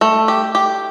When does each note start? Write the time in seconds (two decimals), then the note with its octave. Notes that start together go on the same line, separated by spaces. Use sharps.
0.01 A3
0.28 G4
0.55 G4